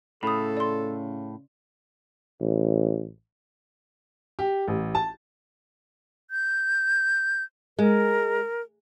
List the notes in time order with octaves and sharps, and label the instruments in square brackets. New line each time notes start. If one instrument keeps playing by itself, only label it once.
[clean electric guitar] A2 [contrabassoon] C#3 [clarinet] A4 [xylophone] B5 D#6
[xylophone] D5 C6
[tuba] A1
[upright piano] G4
A1
A5
[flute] G6
[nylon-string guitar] G#3 [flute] A#4